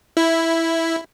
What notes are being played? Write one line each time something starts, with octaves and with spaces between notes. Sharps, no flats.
E4